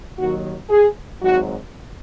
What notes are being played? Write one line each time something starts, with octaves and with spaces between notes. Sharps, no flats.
D#2 D#3 F#3 F#4
G#4
G#1 G#2 F#3 F#4